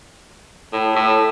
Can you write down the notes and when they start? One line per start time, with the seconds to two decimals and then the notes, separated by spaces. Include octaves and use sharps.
0.73 A2
0.96 A2